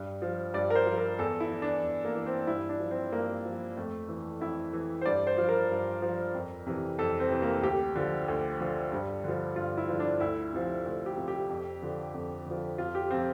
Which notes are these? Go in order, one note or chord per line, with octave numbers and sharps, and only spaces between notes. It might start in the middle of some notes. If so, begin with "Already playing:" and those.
Already playing: G2
F3
G2 D5
A#4
C5
F3
A#4
E2 A4
E4
E3
D4
E2
A#3
E3
C4
G2 E4
D4
F3
C4
G2 A#3
F3
F2 A3
E3
F2 E4
E3
C5
G2 D5
C5
F3
A#4
G2
F3
F2
C3 E3
F2 A4
C4
C3 E3
A#3
D2 G4
D3 F3
D2
D3 F3
G2
D3 F3
G2 F4
E4
D3 F3
D4
D2 E4
C3 F3
D2
G4
C3 F3
G4
F2
D3 F3
F2
D3 F3
F2 F4
G4
C3 F3 C4